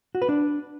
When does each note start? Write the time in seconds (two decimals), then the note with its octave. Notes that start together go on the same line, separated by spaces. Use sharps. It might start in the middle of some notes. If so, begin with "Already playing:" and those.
0.15 F#4
0.22 B4
0.29 D4